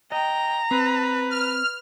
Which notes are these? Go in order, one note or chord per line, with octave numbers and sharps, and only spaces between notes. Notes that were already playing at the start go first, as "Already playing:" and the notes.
D#5 G5 A#5
C4 B4
F6